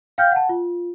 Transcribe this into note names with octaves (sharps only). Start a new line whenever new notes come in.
F5 G5 F6 G6
F#5 A5
F4